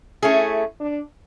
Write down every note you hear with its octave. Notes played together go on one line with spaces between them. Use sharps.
A3 C#4 E4 G#4
D4